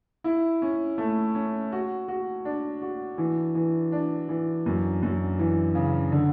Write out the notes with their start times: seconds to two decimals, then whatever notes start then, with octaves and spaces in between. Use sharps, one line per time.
0.24 E4
0.62 C#4
0.98 A3
1.35 C#4
1.72 F#4
2.08 F#4
2.45 D4
2.82 F#4
3.18 E3
3.55 E3
3.92 D4
4.29 E3
4.66 F#2
5.03 F#2
5.39 E3
5.75 C#3
6.12 D3